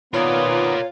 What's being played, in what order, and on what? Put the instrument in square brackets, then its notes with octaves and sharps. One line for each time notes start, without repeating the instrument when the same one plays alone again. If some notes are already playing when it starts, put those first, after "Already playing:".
[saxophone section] A#2 F4 [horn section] D#3 B3 [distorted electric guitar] A#4 D5 [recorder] C#5